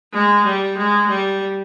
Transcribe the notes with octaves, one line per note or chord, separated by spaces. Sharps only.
G#3
G3
G#3
G3